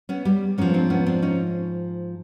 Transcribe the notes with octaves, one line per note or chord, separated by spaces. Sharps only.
B3 C#4
G3
G#2 F3 B3 C#4
C4 D4
B3 C#4
C4 D4
C#4 D#4